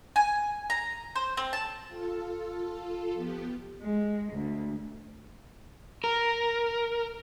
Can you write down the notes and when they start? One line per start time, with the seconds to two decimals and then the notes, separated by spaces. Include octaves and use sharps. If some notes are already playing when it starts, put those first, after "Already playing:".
0.16 G#5
0.70 A#5
1.15 C5
1.37 C4
1.53 A5
1.88 F4 A4
3.15 F3 B3 G4
3.81 G#3
4.33 D2
6.04 A#4